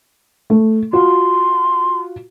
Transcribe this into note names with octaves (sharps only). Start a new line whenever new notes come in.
A3
F4 F#4 C6